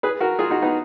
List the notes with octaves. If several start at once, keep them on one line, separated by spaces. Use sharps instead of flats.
G#4 B4
F#4 A#4
F4 G#4
D#4 F#4
B3 D#4